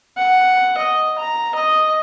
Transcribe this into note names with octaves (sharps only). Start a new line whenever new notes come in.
F#5
D#5
A#5
D#5